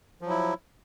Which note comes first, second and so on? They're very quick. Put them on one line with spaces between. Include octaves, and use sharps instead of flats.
F3 F#3 E4